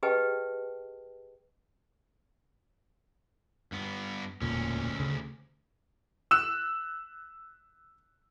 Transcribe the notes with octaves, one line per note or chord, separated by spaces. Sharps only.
G4 G#4 B4 D#5 G5 A5
G2 B3
E1 D2 A#2 C#4
C#3
E6 F#6 E7